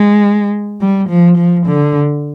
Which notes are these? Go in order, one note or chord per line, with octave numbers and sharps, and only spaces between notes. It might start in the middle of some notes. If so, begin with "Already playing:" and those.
Already playing: G#3
G3
F3
F3
D3